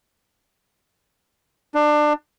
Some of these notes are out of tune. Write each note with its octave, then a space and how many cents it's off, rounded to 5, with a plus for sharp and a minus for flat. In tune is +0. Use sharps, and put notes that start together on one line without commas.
D4 +25